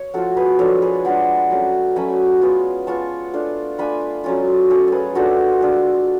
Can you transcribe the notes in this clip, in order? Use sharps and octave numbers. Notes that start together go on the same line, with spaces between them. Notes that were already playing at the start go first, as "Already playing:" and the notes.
Already playing: C#5
F3 A3 F4 F#4 A4
G#4 B4
F3 G#3 D4 A4 C#5
G#4 B4
F3 G#3 D4 F#5 A5
F#3 A3 C#4
F#3 A3 C#4 G#5 B5
G#3 B3 F4
G#3 B3 F4 A5 C#6
A3 D4 F4
A3 D4 F4 G#5 B5
F#3 A3 C#4 F4
F#3 A3 C#4 F4 A4 C#5
G#4 A4 B4
G#3 D4 F4 F#4 A4
G#3 D4 F4